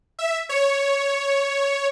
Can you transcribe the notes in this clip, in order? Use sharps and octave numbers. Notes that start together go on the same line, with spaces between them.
E5
C#5